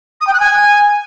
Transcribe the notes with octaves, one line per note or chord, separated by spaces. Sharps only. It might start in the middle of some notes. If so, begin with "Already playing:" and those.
D#6
G5
F#6
G#5